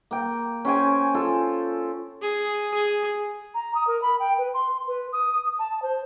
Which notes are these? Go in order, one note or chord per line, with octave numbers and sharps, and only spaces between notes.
A#3 G5
C#4 C5 G5 G#5
F4 A4
G#4
G#4
A#5
D#6
A#4
B5
G5
B4
C6
B4
D#6
A5
C5